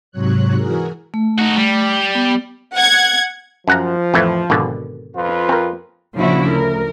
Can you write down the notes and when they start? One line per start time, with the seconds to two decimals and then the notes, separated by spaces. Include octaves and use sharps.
0.11 G#2 C3 F#3 C#5 F#6
0.56 E3 F#4 G#4 A#4
1.14 A3
1.39 D#4 F#4
1.57 G3
2.15 B3
2.75 F#5 G#6
3.68 F#2 F3 F#5 A#5
4.14 F2 A2 E3
4.50 G#1 B2 D3
5.16 F2 F4 B4
5.49 C4 A#4
6.16 A#2 C#3 F3 D4 E4 F#4
6.48 D2 A#4